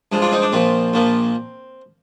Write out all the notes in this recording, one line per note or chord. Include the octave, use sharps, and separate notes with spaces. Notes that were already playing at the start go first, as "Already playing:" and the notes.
G2 F3 G#3
D4 F4
C4 D#4
D4
A#1 A#2 F3 C4
A#1 A#2 F3 A#3